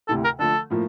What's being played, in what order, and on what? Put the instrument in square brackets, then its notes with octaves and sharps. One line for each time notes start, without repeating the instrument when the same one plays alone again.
[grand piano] D2 C3 E3 [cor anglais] A4
[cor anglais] A#4
[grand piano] D3 F3 A3 [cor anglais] A4
[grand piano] A2 F3 A#3